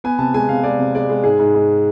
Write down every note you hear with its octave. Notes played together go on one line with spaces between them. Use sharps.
B3 G#5
C3 A5
G#3 G#5
C3 F5
G#3 D5
C3
G#3 D5
G#3
G#2 G#4
G#2
G#2